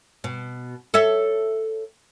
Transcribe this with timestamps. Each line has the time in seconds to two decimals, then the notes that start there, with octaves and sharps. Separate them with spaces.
0.24 B2
0.94 A4 C#5 E5